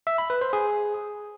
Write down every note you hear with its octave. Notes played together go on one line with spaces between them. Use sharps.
E5
B5
B4
C5
G#4